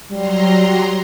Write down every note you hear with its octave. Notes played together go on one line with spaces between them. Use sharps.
F#3 G3 A#5 C6